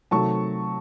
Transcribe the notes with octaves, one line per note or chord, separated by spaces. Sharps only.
C3 D#3 F#3 A3 A5 C#6